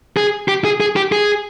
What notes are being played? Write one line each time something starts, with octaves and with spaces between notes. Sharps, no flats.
G#4
G4
G#4
G#4
G4
G#4